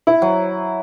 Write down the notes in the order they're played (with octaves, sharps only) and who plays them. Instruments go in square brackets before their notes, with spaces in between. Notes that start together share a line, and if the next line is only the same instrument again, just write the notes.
[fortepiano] E4
[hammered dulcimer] F#3